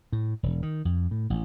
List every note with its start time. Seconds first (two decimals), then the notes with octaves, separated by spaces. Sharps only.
0.12 A2
0.43 E1
0.63 D#3
0.85 F2
1.11 A2
1.30 A1